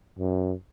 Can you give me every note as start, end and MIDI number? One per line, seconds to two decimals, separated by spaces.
0.19 0.53 42